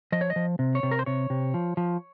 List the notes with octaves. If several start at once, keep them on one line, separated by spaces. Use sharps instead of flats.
F3 D#5
C#5
D#5
F3
C3
C#5
C3
A#4
C5
C3 C#5
C3
F3
F3